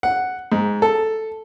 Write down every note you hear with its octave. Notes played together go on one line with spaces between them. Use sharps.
F#5
G#2
A4